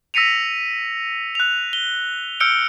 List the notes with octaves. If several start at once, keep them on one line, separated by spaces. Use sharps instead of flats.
E6 A#6 B6 C#7 D#7 F7
F#6 F7
G7
E6 F6 G6 C#7 D7 G7